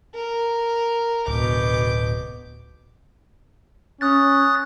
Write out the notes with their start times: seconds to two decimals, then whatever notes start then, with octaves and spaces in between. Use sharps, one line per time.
0.15 A#4
1.28 D1 B2 D6 G6
4.01 C#4 D#6 F#6 A6